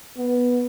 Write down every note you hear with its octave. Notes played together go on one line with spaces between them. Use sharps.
B3